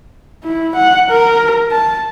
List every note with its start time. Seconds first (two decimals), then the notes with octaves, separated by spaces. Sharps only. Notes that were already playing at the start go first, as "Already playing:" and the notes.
0.45 E4
0.76 F#5
1.11 A#4
1.71 A5